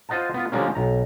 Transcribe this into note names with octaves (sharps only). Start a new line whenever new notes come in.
F4 C5 D#5 F#5 A5
B3 F4
D3 F3 G3 G#3 A#3 C#4
B1 A#5